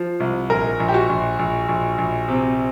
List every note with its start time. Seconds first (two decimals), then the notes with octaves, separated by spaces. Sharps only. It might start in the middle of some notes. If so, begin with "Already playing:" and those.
Already playing: F3
0.20 C2
0.50 A#1 A#4
0.80 A#1
0.88 G4
0.94 F#4
1.09 A#1
1.39 A#1
1.69 A#1
1.98 A#1
2.29 C3